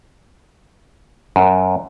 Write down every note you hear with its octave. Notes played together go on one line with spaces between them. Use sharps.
F#2